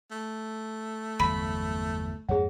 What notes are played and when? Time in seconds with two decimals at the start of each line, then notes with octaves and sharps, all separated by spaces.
0.11 A3
1.19 G1 E2 F#3 B5
2.29 F2 G#2 A#3 G#4 C#5 F#5